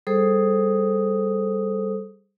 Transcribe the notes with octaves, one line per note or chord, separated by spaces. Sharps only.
G3 G#4 A4 C5 D#6